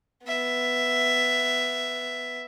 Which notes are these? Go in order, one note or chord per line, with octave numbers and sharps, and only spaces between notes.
B3 E5